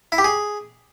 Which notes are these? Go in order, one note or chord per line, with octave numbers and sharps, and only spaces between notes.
E4
G4
G#4